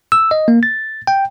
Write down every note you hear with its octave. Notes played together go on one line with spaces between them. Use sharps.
E6
D#5
A#3
A6
G5